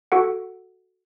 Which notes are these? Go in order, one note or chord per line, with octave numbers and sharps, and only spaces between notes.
F#4 A4 F#5